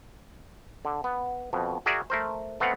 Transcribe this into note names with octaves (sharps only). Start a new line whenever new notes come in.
D3
B3
F2 B2
F#4 G#4 A#4 D5 E5
A3 A#4 C5
A3 B3 C4 F5 F#5